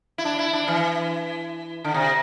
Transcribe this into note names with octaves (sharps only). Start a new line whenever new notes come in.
E4
D4
E4
D4
E3
D3
C3